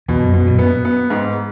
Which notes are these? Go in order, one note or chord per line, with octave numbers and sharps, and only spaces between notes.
E2 B2
F#2
B2
F#2 A#2
B3
B3
G#2